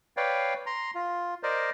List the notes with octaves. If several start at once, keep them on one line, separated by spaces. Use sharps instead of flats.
B4 C#5 D5 F5 G5
A#5 C6
F4
A#4 C5 D5 D#5